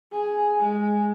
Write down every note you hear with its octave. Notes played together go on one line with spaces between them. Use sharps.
G#4
G#3